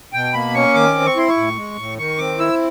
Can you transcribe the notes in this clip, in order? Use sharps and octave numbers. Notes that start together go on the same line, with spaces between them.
B2 G5
A#3 B5
C#4 C#6
D#3 D6
C4
C#6
E4 C6
C#6
A2
G#3
A2
D#3 C#6
C4 D6
E4 E6